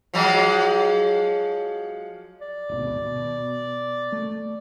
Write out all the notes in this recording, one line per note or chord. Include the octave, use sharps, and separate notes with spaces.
F3 F#3 G#3
D5
D1 G#1 B2
B2
A3